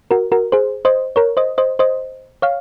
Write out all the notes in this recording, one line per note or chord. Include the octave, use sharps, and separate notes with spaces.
F#4 A#4
F#4 A#4
G#4 C5
C5 D#5
A#4 C#5
C5 D#5
C5 D#5
C5 D#5
C#5 F5